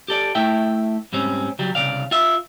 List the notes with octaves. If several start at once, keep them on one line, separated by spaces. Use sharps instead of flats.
G4 A4 D5
A3 E4 E5 G5
G#2 G3 C4 C#4
C#3 F#3 G3
C2 C#3 D5 F5
F4 E5